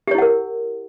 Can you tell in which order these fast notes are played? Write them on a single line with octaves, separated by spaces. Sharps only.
G4 C#5 E4 F#5 A#4